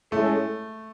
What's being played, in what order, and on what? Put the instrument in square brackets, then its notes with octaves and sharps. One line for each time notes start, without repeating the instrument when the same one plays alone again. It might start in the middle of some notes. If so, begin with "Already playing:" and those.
[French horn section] A2 G#3 C#4 E4 A4 [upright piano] A3